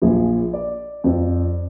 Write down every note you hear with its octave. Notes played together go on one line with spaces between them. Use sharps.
A#1 A#2 F3 G#4
D5
F2 F3